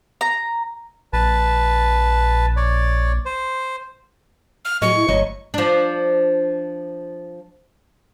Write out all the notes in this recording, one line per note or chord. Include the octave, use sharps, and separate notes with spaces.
A#5
A#1 B4 A5
C#5 D5
C5
F6
A2 F#3 G#4 D#5 C#6
E4
G1 D2 F#3 C#5 D#5
F3 D4